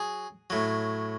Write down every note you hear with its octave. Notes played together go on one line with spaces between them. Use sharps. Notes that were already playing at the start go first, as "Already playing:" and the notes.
Already playing: F#3 G#4
A2 F#3